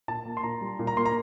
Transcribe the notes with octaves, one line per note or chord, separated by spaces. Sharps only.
A#2 A5
A#3
C6
A#2 A#5
G3
A#2
A#5
A#3 C6
A#5